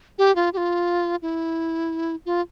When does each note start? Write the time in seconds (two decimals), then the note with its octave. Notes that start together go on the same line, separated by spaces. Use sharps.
0.18 G4
0.36 F4
0.53 G4
0.57 F4
1.22 E4
2.26 F4